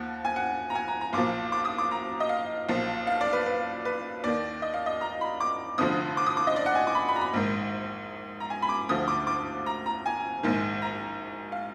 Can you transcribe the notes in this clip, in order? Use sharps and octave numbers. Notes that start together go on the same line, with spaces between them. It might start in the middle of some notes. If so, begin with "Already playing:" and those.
Already playing: D#2 F3 F#5
G#5
F#5
A#5
G#5
A#5
A#5
B1 A#2 F3 D6
D6
D#6
D6
A#5
D#5
F5
B1 A#2 F3
F5
D5
B4
B4
B4
D#2 D#3 D5
D#5
F5
D#5
A#5
B5
D6
F1 F2 D3 F3 D#6
D6
D#6
D6
D#5
D5
F#5
G#5
D6
B5
B5
A#5
B5
A#1 G#2 D#3
A#5
G#5
B5
D6
D2 D3 F3 D#6
D6
D6
A#5
A#5
G#5
A#1 G#2 D#3
A#5
F5